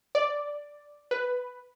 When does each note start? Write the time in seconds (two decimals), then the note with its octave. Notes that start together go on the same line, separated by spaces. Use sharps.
0.15 D5
1.11 B4